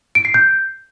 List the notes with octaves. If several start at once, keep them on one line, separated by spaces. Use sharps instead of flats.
D7
C7
G6